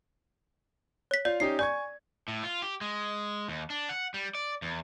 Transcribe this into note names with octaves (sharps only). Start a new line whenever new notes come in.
C#5 B6
F4 D5 F5
C#4 D#4 G4 C7
D5 G#5 C#6 G#6
A2
F4
G4
G#3
D#2
D4
F#5
G3
D5
E2